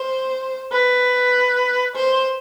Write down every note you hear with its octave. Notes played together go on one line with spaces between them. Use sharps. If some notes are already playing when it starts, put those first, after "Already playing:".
Already playing: C5
B4
C5